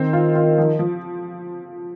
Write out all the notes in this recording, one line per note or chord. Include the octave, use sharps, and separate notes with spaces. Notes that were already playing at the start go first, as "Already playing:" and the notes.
Already playing: D#3 C4
F4
F4
F3
F3